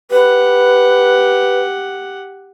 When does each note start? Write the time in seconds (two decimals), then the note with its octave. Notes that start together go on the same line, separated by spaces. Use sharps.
0.11 G4 B4 F#5